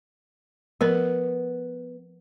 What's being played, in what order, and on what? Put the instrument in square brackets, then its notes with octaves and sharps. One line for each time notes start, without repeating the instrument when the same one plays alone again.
[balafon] F3 A#4 B4 [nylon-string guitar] B3